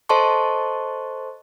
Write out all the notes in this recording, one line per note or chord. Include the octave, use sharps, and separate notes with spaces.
A4 C5 D#5 A5 C6 C#6